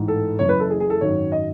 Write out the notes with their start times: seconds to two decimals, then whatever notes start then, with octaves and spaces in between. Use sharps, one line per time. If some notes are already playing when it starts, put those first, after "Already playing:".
Already playing: A1 G#2 E3
0.08 A4
0.39 F#1 F#2 E3 C#5
0.49 B4
0.60 A4
0.70 G#4
0.80 G#4
0.90 A4
1.01 G#1 F#2 D#3 F#3 C#5
1.32 D#5